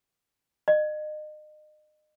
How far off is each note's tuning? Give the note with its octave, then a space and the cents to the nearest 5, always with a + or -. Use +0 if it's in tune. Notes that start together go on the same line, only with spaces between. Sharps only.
D#5 -35